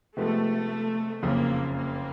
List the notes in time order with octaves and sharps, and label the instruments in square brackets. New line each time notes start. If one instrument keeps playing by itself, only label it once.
[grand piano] C3 F3 G#3 B3 [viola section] A3
[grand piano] F#1 F2 C#3 [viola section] A#3
[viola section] A#3